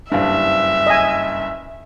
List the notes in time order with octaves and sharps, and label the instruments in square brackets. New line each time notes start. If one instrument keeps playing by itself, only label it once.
[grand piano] F#1 G2 [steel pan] D4 F5 [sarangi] E5
[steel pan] D#5 G#5